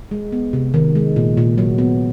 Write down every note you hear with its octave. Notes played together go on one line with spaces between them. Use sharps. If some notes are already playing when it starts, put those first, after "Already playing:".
G#3
B3
C3
D#3
G#3
A#2
A#2
F#3
B3